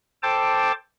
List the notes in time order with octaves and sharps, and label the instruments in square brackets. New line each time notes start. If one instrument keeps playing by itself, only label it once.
[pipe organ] A4 C5 G5 A5 D6